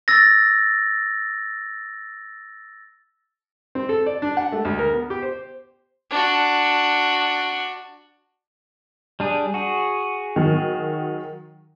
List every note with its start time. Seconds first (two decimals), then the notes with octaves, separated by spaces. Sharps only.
0.08 E6 A6 A#6
3.75 C4
3.89 A4
4.06 D5
4.22 D4
4.37 F#5
4.52 A3
4.65 D2
4.79 A#4
4.93 B3
5.10 G4
5.22 C5
6.11 D4 F#4
9.20 G3 D4 G#4
9.54 F#4 G#4
10.36 D#3 F#3